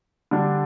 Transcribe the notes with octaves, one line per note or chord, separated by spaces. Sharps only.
D3 G3 D4